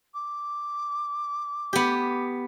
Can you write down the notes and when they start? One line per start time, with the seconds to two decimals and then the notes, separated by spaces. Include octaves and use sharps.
0.14 D6
1.73 B3 G4